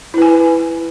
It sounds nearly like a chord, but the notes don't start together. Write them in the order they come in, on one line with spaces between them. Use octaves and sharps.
E4 B4 G#5